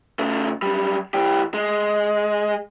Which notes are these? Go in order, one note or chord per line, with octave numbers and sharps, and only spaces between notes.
C#3 A3
F#2 G3
E3 G4
G#3